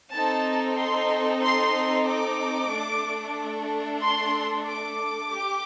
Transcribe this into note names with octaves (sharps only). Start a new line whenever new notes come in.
C4 D#4 A4 A5
C6
C6
D6
A3 D4 A4
C6
D6
G4